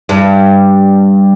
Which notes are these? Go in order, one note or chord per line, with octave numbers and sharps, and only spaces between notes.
G2